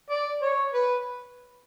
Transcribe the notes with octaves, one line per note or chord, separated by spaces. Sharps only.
D5
C#5
B4